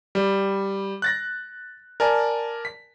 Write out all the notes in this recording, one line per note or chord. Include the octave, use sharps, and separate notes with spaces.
G3
F#6 A6 A#6
A#4 D5 G#5 A5
B6